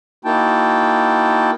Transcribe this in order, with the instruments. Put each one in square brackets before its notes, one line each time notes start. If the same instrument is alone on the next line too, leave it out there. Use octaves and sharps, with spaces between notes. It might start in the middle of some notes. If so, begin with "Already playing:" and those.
[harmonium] A#3 D#4 E4 F#4 G5 A5